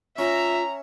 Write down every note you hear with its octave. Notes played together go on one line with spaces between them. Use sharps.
C#4 F4 E5 A#5